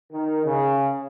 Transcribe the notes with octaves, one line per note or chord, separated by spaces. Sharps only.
D#3
C#3